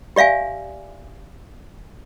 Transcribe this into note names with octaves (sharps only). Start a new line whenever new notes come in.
G4 D5 E5 F5 G#5